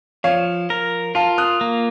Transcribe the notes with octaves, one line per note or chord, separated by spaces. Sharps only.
F3 C#5 F5
A#4
F4 F5 A5
D#6 F#6
A#3